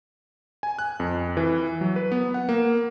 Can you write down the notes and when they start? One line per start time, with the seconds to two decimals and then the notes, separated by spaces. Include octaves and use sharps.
0.63 G#5
0.79 F#6
1.00 F2
1.37 E3
1.81 F#3
1.96 B4
2.12 B3
2.34 F#5
2.49 A#3